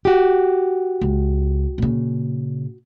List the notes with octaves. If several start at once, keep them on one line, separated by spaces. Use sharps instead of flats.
F#4 G4
C#2
A#2 C#3